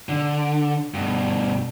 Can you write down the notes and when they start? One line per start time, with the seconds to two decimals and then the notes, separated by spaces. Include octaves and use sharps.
0.09 D3
0.94 G2 B2